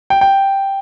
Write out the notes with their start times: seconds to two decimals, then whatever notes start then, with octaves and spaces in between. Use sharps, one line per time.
0.10 G5
0.21 G5